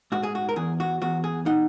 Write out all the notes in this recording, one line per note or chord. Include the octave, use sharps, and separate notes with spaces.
G#2 F#4
G#4
F#4
A#4
E2 G#4
F#4
E2 F#4
G#4
D#4 F#5